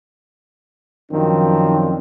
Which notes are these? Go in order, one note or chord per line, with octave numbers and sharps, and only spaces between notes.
F#2 D#3 F3 C4 D4